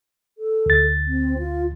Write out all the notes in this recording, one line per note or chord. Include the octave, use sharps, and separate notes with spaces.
A4
D2 A6
C4
F4